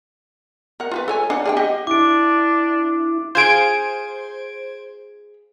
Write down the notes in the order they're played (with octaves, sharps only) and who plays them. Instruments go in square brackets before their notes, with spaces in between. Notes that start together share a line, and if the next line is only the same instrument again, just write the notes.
[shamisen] A#4 F#5
F4 G4 B4
A4 C#5 G#5
D4 F#5
G#4 D#5 G5
G4 D#5 F#5
[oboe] D4 [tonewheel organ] E4 [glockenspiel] D6 D7
[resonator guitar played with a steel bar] F4 G#4 [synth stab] C5 G#6 D7